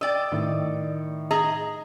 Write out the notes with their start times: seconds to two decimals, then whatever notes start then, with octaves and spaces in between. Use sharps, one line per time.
0.01 D5 D#5 G5 E6
0.32 A2 D#3
1.31 G#4 D#5 A#5